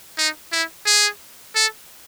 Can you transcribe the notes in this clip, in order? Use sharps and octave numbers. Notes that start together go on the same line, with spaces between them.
D#4
E4
G#4
A4